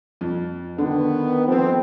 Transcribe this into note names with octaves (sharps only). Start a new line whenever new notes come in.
F2
D3 D#3 B3
F3 A3 B3 C4